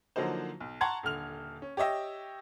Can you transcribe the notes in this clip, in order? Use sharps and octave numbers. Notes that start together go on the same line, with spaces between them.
D3 F3 F#3 A#3 D#4 C5
B1
F#5 A5 A#5 C6 C#6 G#6
D#1 D3 F6 F7
C#4
G4 C#5 D#5 E5 G5